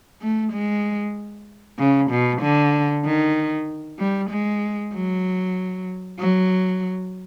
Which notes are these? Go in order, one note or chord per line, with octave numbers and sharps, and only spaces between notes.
A3
G#3
C#3
B2
D3
D#3
G3
G#3
F#3
F#3